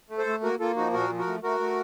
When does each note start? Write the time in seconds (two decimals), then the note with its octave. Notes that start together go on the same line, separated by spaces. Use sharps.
0.10 A3
0.18 A4 C5
0.26 A3
0.43 A#3 F#4 A#4
0.60 A#3 F4 A4
0.76 F3 D#4 F#4
0.93 A#2 F#4 A#4
1.10 F3
1.18 F#4 A#4
1.27 A3
1.43 A3 F#4 A#4
1.60 A3